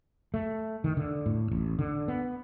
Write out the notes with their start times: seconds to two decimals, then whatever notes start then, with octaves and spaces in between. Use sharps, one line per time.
0.34 A3
0.84 D#3
0.97 D3
1.26 A2
1.51 A1
1.79 D3
2.08 B3